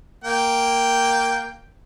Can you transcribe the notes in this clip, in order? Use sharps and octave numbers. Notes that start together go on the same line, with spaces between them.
A#3 G5